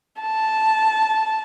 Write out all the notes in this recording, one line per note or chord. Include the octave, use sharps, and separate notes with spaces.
A5